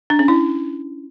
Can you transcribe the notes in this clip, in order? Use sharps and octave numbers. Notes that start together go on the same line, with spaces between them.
D4
C#4
E4